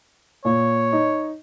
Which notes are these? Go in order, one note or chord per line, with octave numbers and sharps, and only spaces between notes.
A#2 C#5
D#4